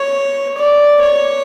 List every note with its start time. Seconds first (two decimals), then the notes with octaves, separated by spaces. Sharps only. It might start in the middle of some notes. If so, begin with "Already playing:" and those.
Already playing: C#5
0.57 D5
1.03 C#5